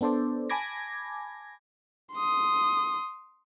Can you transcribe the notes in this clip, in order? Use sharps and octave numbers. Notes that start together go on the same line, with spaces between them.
B3 D4 A4 C5 D5
G#5 A5 B5 D6 G#6 A#6
C6 D#6